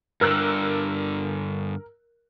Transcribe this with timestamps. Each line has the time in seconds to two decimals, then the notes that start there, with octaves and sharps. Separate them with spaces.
0.21 G2 D3 A#4 E6 F#6